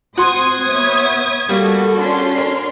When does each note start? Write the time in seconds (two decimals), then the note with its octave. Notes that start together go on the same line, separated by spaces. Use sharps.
0.18 C4 F#4 C5 C6 D#6 G#6
0.69 B3 C#5 E5
1.49 G3 A#3 F#4 A4
1.98 C#4 D4 C6
2.38 A#4